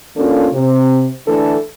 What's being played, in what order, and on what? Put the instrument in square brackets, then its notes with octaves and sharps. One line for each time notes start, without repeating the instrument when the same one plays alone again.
[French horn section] E3 A#3 C#4 D4 F4 A4
C3
D3 E3 A3 D4 A4